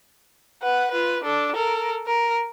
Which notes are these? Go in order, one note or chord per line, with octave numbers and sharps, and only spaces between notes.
B4 F#5
F4 B4
D4 A4
A4 A#4
A#4